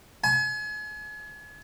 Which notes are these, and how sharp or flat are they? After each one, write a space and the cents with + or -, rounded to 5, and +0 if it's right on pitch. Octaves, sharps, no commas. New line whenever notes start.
G#5 +40